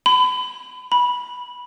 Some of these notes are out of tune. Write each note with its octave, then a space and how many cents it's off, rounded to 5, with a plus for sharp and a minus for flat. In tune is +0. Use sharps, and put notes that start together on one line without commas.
B5 +30
B5 -10